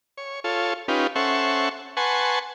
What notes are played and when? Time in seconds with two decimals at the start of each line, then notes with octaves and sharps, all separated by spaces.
0.17 C#5
0.44 F4 A4 C#5
0.88 C#4 D#4 F4 G4 B4
1.16 C#4 A4 C5 E5 F#5 C#6
1.97 B4 F#5 G#5 A5 C6 C#6